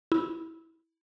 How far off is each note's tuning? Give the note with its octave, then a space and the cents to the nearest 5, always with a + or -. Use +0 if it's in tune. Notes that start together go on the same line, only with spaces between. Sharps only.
E4 -15